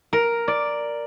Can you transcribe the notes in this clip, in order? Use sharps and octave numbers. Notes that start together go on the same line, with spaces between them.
A#4
D5